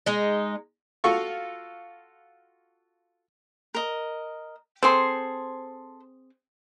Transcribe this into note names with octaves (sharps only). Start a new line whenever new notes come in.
G#3 D#4
F4 F#4 A4 F5 C#6
A#4 D#5
C4 G#4 A4 C5 C6